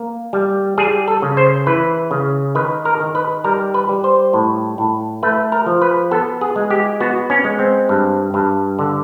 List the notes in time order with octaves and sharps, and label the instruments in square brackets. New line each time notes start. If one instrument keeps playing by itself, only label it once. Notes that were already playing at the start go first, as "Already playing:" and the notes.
Already playing: [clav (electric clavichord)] A#3
G3
G3 G#4
A4
C#3
C5
E3 B4
C#3
D#3 B4
A#4
D#3
B4
G3 A#4
B4
G3
C5
A2
A2
A3 B4
A#4
F3
B4
B3 A4
G#4
G#3
G4
B3 F#4
C#4
G#3
C4
G2
G2
D3